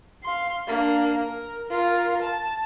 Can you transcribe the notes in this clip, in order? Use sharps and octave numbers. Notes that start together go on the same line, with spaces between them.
F5 C6
A#3 D4
A#4
F4 A#4
A5